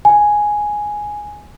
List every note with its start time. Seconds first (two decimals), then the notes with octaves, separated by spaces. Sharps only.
0.05 G#5